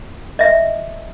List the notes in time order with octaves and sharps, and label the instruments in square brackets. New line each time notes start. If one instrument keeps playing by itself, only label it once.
[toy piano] D#5 E5